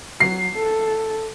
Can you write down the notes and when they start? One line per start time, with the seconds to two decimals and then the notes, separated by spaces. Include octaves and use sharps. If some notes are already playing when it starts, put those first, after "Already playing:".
0.20 F#3 C7
0.56 A4